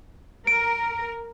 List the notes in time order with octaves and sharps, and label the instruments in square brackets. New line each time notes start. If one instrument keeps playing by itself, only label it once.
[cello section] A#4 [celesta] D7